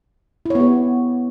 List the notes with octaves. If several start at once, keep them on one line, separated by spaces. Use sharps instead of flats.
B3 E4 G4 C#5